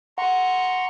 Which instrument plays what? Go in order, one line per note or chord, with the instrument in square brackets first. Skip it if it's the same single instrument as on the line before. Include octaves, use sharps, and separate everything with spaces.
[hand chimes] F#5 [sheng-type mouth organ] A#5 C6 C#6